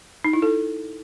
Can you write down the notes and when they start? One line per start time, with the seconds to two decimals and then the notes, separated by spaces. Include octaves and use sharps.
0.24 D#4
0.33 E4
0.42 A4